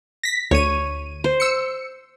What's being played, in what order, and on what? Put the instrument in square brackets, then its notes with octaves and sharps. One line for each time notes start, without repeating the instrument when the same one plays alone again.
[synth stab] A#6 B6
[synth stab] D2 D#7 [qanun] C#5
[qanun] C5
[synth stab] E6 C#7